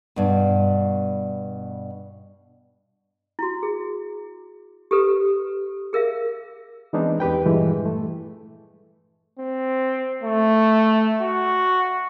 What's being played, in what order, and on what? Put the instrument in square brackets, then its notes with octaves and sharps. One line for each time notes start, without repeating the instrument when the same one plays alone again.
[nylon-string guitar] G2 B2
[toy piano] E4 F#4
G#4
G4 A4 B4
G#4 A#4 E5 F5
[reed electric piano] E3 G#3 B3 C4 D4 D#4
E2 G4 B4 G5
G2 A#2 E3 F3 G3 G#3
A3
[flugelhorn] C4
A3
F#4